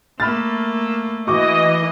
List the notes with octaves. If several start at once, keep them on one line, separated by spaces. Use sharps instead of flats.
A3 A#3 B5 F6 A6
E3 F#4 D#5 C#6 D6